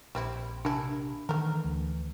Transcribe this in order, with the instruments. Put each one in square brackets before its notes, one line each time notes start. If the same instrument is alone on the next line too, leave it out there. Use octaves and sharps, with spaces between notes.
[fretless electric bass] A#1 [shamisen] G3 C4 E4
[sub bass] C3 [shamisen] A#3 E4 [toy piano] D4 A5 B5
[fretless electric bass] D#3 [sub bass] E3 [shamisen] A3 A#4
[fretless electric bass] D2